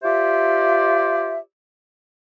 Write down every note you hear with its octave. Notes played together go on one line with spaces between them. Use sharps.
F4 G4 C5 D5 E5